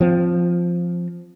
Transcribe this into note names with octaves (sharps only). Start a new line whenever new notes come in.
F3 C4